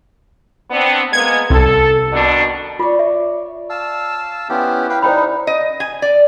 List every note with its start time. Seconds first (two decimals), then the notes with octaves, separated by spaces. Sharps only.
0.71 B3 C4 D4
1.13 G#3 A#3 B3 G#6
1.50 C2 A4
2.12 B2 D#3 D4
2.79 F4 C#5 D5
2.99 E5
3.70 F5 A5 E6
4.49 B3 C#4 E4 G4 C5
4.90 B4 F5 G5
5.02 G3 C#4 D#4 C5 E5 G5 B5
5.47 D#5
5.80 G#5
6.02 D5